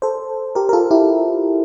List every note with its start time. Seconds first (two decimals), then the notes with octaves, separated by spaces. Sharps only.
0.02 A4 C5
0.55 G4 A#4
0.69 A#4
0.73 F4 A4
0.91 E4 G4